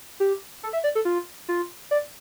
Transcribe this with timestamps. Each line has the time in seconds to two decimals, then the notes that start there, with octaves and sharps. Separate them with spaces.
0.20 G4
0.63 A4
0.73 E5
0.84 D5
0.95 A4
1.05 F4
1.48 F4
1.91 D5